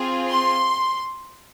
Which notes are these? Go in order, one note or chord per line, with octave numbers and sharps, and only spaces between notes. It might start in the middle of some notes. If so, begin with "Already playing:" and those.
Already playing: C4 F4 G#4
C6